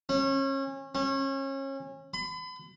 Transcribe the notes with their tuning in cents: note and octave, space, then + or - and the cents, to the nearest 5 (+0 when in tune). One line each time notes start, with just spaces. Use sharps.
C#4 -30
C#4 -30
B5 +40